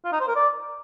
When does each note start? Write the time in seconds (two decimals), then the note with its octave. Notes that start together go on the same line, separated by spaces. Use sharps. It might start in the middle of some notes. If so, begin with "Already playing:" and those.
0.05 F4
0.12 D#4
0.20 C5
0.28 A#4
0.35 D5